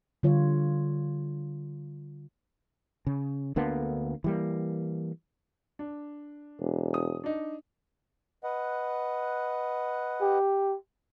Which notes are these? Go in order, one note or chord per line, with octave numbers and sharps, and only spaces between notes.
D3 G3 F4 C#5
C#3
D2 D3 A#3 B3
E3 G3 A#3
D4
E1
D#6
D4 D#4
B4 D#5 F#5
G4